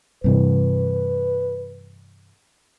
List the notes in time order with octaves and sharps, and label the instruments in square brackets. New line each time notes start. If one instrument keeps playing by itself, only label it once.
[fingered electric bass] G2 C3 E3 [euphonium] B4